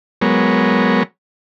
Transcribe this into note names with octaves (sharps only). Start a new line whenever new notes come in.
F#3 G#3 B3 A#4 C#5